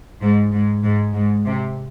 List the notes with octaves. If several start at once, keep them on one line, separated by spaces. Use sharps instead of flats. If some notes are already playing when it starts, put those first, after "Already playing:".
G#2
G#2
G#2
G#2
C3